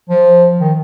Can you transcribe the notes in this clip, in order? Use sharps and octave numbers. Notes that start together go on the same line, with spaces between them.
F3
D#3